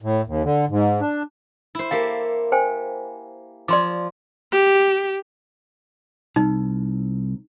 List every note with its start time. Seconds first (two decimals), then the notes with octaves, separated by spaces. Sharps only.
0.02 A2
0.27 D#2
0.44 D3
0.69 G#2
1.01 D4
1.75 E4 C5
1.91 A#3 G4 A4 F5
2.52 C5 G5 G#5
3.68 F3 D5 C6 D6
4.52 G4
6.36 C2 D#4